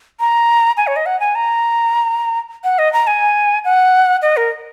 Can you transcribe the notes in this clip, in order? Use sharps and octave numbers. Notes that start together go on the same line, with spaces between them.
A#5
G#5
C#5
D#5
F#5
G#5
A#5
F#5
D#5
A#5
G#5
F#5
D#5
A#4